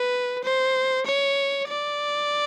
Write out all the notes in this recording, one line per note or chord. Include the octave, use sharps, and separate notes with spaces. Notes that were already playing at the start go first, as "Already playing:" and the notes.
Already playing: B4
C5
C#5
D5